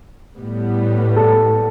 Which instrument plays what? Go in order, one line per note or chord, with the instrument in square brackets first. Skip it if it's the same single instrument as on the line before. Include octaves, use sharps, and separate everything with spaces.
[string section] A2 G3 B3
[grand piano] A4